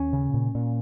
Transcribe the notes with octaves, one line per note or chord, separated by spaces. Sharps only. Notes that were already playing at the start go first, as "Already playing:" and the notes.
Already playing: D#2 C#4
C#3
A#2
A#2